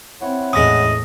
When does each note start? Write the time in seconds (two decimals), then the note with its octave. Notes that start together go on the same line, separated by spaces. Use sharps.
0.21 C4 E4 C#5 F#5
0.53 E2 A2 G#3 C#4 D#6 A#6